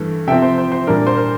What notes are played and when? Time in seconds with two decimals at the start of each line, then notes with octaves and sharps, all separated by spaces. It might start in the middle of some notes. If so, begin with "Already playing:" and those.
Already playing: G2 E3 A3
0.27 C3 F3 C4 E5 G5
0.42 C5
0.58 C5
0.72 C5
0.87 A#2 G3 A#3 D4 A#4
1.07 C5
1.17 A#4